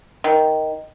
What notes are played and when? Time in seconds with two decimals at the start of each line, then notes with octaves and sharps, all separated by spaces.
0.24 D#3